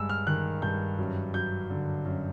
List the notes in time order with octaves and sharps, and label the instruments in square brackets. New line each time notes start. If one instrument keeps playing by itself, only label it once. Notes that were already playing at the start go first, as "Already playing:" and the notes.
Already playing: [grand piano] G2 G#3 E6
F6
D#3 F#6
G2 G6
F#2
F#3 G6
D3
F#2